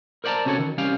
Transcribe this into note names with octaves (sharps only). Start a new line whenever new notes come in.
A#4 C5 D5 E5 A5 A#5
C3 C#4 F#4 A4 C#5
D#3
C2 C#4 G4 F5